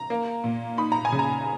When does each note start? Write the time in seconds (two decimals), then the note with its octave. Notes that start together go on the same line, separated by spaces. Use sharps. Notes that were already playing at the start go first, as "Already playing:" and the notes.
Already playing: A#5
0.10 A#3
0.44 A#2
0.78 D#4 B5
0.92 A#5
1.05 G#5
1.12 C#3
1.19 A#5